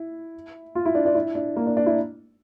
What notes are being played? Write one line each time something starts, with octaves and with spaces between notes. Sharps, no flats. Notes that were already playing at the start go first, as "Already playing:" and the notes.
Already playing: E4
F4
E4
D4
D4
E4
D4
A#3
D4
D4
E4